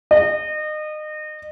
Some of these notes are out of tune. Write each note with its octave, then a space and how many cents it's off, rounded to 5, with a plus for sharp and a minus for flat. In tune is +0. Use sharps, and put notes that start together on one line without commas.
D#5 -30